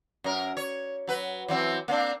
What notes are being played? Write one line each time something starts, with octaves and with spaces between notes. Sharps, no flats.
F#2 A#4
C#5
F#3 B4
E3 F#3 C4
A#3 C4 D4